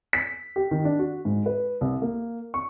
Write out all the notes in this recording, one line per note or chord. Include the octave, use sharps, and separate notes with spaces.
B6
G4
D#3
D4
F#4
G#2
B4
C2
A#3
C#6